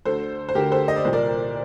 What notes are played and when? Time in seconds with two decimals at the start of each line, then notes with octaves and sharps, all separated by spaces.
0.05 D2 D3 A4 C5
0.49 C5
0.55 D2 D3 G4 A#4
0.72 A4 C5
0.88 D#5
0.96 D5
1.05 C2 A#2 C5
1.13 A#4 D5